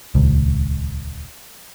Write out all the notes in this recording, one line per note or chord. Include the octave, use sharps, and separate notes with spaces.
D#1 C#2